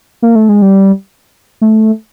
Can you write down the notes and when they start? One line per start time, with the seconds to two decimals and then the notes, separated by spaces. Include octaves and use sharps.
0.22 A#3
0.35 A3
0.49 G#3
0.62 G3
1.61 A3